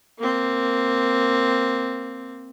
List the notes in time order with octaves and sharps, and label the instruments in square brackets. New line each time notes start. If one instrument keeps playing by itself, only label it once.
[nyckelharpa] A#3 C4